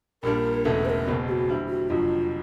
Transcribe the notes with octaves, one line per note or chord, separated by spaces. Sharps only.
A#1 A#2 G3 A#3 D4 A#4
E1 E2 C#3 E3 A3 A4
C5
A#4
F#1 E2 B2 G#3 C4
G4
F#4
D3 G3 C4 E4
F#4
F1 F2 D3 F#3 F4